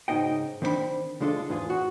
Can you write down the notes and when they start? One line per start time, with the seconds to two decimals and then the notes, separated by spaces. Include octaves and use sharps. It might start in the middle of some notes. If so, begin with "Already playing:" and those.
0.08 G#2 C#3 D4 D#4 D#5 G5
0.62 D#3 C4 D4 E4 B5
1.20 C#2 D3 G#3 D4 F4 A4
1.49 E2 G#2 F4 G#4
1.70 F#4